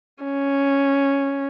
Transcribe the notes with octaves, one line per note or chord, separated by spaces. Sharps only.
C#4